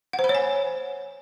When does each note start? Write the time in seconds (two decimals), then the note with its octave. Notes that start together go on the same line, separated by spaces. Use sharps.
0.13 F#5
0.19 C5
0.24 B5
0.29 C#5
0.35 G#5